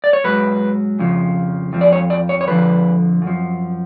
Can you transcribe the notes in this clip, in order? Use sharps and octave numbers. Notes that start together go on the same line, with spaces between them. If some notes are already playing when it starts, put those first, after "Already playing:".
D5
C#5
G#2 F#3 B4
F2 C#3 F3
F2 F3
D5
C#5
D5
C#5
C#5
F2 D3 F3 B4
F#2
F3